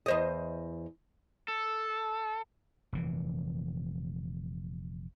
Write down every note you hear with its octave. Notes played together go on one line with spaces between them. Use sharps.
E2 C5 D#5
A4
F1 A#2 E3